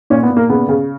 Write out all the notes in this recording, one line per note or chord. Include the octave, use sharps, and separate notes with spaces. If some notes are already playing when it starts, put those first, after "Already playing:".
A#2 C#4
B3
A#2
A#3
C#3 B3
C#3